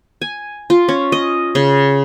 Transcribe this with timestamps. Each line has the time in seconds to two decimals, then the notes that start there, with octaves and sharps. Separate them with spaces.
0.22 G#5
0.70 F4
0.88 C#4
1.12 D#5
1.55 C#3